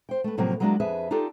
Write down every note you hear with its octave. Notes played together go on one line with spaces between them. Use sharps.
C5 G5
A3 B4
A2 C3 F3 F#3 A#3 B3
F#3 G#3 A#3 D4 E4 F#4
F2 G#4 B4 E5 A5
D4 D#4 F4 G4 A4